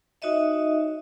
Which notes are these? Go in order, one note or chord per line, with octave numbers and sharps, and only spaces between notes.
D#4 F#4 C#5 D#5 E5